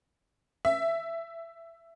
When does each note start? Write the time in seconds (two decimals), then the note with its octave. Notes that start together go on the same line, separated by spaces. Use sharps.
0.65 E5